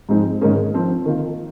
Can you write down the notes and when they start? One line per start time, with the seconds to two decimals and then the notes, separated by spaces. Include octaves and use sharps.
0.09 G#2 F3 G#3 C4 D#4
0.41 G#2 D#3 A#3 C#4 G#4
0.74 F3 C4 F4 C5
1.06 D#3 A#3 F4